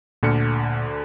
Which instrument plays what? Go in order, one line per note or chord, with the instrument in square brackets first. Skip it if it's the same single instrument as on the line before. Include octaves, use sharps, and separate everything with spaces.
[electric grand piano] D2 D3 C#7 [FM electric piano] A#2 F6